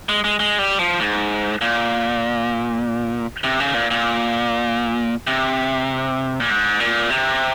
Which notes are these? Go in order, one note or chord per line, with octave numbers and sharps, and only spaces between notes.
G#3
G#3
G#3
G3
F3
G#2
A#2
C3
C#3
A#2
A#2
C3
A#2
G#2
A#2
C3